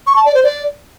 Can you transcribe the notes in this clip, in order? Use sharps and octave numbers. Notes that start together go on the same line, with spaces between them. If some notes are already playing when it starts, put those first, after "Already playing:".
C#6
A5
D5
C5
D5